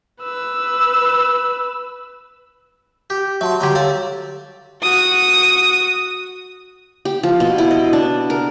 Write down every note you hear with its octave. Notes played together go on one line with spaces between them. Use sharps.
B4 E6
G4
F#3 E5 A5 C6
D3 F#3 G3 G4 A#5
A4 C#5 F5
F#4 D#6
G4
F3
B2
E4
D#5
D4
A#4